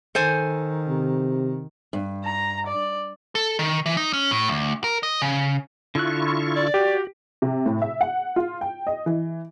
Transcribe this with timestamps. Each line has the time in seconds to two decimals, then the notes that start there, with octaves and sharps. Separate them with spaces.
0.15 D#3 A4 C5 G#5
0.88 C3
1.93 G2
2.24 A#5
2.67 D5
3.35 A4
3.59 D#3
3.86 E3
3.97 D#4
4.13 C#4
4.31 A2
4.49 D2
4.84 A#4
5.03 D#5
5.22 C#3
5.95 D3 E4 F4 C#6 F#6
6.55 D5
6.74 F#4 G4
7.42 C3
7.66 A2
7.82 E5
8.01 F#5
8.36 F4
8.61 G5
8.87 D#5
9.06 E3